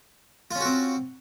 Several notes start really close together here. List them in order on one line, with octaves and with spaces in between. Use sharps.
F4 C#4 F#4 C4